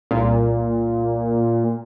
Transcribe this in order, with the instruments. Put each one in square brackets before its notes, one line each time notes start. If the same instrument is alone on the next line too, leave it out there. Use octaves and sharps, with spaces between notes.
[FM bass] C2 [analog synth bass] A#2